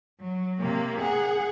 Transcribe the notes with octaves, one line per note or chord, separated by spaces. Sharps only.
F#3
C3 A#3
G#4 F#5